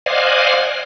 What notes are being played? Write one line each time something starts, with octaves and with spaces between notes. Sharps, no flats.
C5 D5 D#5 F5 F#5 G#5